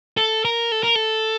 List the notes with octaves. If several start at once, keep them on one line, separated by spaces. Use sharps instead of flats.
A4
A#4
A4
A#4
A4